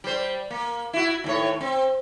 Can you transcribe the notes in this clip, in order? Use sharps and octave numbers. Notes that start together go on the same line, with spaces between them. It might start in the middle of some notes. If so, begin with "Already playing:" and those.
G3 C5
A#3
E4 F#4
D#2 A2 C#5
C4